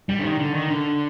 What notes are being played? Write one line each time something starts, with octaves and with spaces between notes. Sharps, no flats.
G3
D3
D#3
D3
D#3
D3